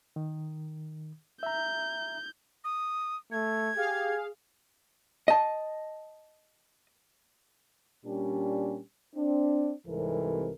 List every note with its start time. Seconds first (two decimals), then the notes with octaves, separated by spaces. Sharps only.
0.16 D#3
1.43 E5 A#5 G6
2.64 D#6
3.32 A3 G#6
3.77 G4 G#4 F5
5.28 D#5 A5
8.06 A#2 G3 C#4 D4 G4
9.16 C4 D4
9.87 C2 G#2 C3 E3 A4 A#4